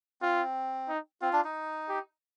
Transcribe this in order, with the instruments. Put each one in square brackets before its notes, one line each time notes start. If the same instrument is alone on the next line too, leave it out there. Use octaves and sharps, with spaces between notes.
[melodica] C4 [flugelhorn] F4
[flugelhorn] D#4
[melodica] C4 [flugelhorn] F4
[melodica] D4
D#4
[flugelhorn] G4